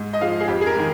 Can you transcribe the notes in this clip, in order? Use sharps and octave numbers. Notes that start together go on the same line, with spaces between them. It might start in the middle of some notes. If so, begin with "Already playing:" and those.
Already playing: G#2
D#5
F3 G#3 F5
G#4
F2 G4
G#4
A#4
D#3 G#3